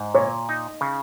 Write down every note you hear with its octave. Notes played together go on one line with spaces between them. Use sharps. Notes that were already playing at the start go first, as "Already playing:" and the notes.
Already playing: G#2
A#2 C#5
D#4
C#3